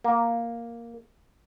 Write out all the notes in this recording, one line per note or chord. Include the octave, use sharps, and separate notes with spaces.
A#3